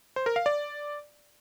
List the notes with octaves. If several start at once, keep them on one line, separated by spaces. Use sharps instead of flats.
C5
A#4
F5
D5